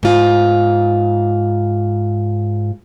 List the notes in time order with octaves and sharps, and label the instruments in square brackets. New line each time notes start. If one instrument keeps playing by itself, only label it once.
[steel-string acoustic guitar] G#2 F4